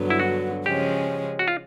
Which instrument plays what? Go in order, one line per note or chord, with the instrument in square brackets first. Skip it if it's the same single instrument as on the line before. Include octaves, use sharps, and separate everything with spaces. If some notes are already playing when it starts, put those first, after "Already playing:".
Already playing: [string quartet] G2 D3 F#3 B3
[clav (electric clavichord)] E4
F#4
[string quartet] C#3 F3 G#3 C#4 [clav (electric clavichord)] G4
[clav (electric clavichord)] F#4
F4